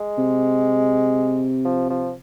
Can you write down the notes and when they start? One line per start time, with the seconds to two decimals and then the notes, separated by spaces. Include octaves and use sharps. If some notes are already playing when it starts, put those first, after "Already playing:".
Already playing: G#3
0.18 C3
1.65 F3
1.90 F3